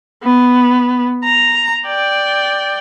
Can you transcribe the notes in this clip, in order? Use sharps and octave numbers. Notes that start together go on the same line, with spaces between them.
B3
A#5
D5 G5